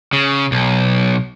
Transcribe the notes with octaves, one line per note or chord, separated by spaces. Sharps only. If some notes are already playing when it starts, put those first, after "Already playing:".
C#3
B1